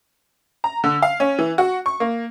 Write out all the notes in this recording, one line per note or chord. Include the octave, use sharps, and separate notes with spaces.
A#5
D3
F5
C#4
E3
F#4
C#6
A#3